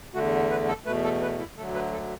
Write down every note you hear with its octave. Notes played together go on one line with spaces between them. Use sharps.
E2 D3 A3 F#4
B4
A4
E2 B2 A3 B4
A4
B4
E4
D2 D3 F#3 A3 A4
B4
A4